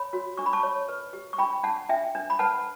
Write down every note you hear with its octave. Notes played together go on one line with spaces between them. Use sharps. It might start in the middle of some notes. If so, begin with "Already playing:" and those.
Already playing: C#5 B5
F#4
D4 C#6
B5
A5 C#6
C#5
B4
G4
C#6
D4 G5 B5
D4 F#5 A5
D4 E5 G5
D4
B5
B4 F#5 A5